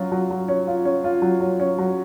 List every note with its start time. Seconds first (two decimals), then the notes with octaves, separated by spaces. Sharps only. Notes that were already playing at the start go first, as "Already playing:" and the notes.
Already playing: F#3 C#4 F4
0.12 F#3
0.31 F#3
0.48 C#4
0.67 F4
0.85 C#4
1.04 F4
1.22 F#3
1.40 F#3
1.60 C#4
1.78 F#3